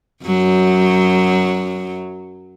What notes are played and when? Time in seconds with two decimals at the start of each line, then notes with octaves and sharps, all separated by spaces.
0.25 F#2 F#3